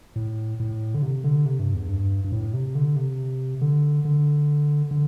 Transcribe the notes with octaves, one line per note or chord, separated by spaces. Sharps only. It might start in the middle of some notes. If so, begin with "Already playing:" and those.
A2
A2
D3
C3
D3
C3
G2
E2
G2
G2
A2
C3
D3
C3
D3
D3
D3